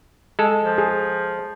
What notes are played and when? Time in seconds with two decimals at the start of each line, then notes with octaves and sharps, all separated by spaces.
0.39 G#3 A4
0.64 F3
0.78 G#4